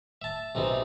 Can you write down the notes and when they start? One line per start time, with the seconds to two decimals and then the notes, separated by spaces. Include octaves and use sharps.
0.22 E5 A5
0.55 B1 C3 E3 D#4